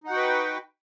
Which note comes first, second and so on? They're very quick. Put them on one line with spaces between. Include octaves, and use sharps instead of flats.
D#4 F#5 F#4 G5 B4